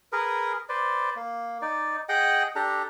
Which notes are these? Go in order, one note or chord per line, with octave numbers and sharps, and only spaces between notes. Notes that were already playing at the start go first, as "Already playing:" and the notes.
G#4 A#4 B4
B4 C5 D5
A#3
D#4 D5
G#4 D#5 F#5 G5
D4 G4 A4 A#5